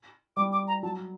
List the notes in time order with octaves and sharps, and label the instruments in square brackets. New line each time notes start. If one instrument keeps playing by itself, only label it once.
[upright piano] G3 [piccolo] D6
[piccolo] D6
A#5
[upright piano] F#3 [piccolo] A5